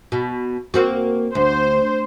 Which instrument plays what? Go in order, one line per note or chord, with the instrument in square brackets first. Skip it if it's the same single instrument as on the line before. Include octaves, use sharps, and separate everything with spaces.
[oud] B2
A#3 C4 F#4
[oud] D2 [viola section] C5